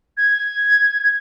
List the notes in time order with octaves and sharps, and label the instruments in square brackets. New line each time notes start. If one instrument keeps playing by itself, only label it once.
[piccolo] G#6